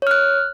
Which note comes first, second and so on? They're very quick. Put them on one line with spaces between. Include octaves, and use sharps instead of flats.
C#5 F6 F#6